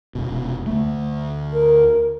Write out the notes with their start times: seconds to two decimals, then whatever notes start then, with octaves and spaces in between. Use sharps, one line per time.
0.15 F1 B2
0.66 D2 A3
1.53 A#4